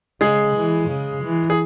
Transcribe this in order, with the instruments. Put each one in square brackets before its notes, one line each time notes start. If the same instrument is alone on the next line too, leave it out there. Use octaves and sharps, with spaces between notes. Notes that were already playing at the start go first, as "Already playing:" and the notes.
[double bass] C#3 [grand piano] G#3 G#4
[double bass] E3
C#3
E3
[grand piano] G#4